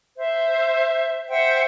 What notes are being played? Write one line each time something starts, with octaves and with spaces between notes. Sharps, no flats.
C5 E5
C5 E5 F#5 G5